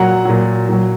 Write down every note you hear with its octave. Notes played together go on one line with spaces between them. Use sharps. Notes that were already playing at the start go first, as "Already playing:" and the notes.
Already playing: A#2 F#3 F#5 A#5
A#2 F#3
A#2 F#3